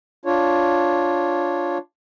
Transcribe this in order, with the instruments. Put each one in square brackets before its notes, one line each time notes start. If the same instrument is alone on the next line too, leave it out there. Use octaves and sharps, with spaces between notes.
[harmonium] D4 F4 C#5